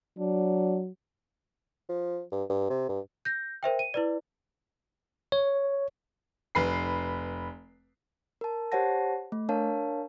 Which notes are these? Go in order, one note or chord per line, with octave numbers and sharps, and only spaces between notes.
F#3 D4
F3
G2
G2
C3
G2
G6 A#6
A#4 C5 E5 G5
D#7
E4 B4 D5
C#5
F1 B4 B5 C7
A#4 A5
G4 C5 C#5 F#5 A5 A#6
A3
D4 A#4 C#5 F5 A5